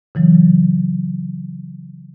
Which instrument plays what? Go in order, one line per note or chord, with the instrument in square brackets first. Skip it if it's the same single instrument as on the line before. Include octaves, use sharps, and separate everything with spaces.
[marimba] C#3 E3 F#3